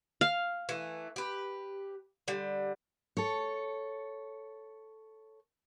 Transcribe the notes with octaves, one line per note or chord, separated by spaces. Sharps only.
F5
E3 A3
G4 B4
D3 G3
A4 C#5